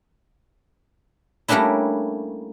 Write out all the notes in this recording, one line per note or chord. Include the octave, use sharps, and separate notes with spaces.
G3 A3 A#3 C#4 D4 E4